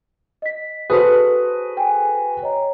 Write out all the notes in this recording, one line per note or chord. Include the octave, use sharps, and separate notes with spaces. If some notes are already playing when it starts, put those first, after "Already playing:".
D#5 B6
F#4 G#4 A4 B4 C5 D#6
G5 G#5
C#5 D#5 A#5